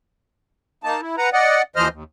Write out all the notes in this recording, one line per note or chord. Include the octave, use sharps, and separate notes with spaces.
A#3 D#4 A5
E4
B4 F#5 A#5
D5 D#5 F#5
D#2 E3 F3 C5 D#5 F6
D#2